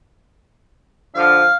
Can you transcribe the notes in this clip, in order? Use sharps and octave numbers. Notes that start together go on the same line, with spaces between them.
D3 F3 D4 F5